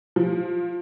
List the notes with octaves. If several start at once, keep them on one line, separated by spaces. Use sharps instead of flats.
F3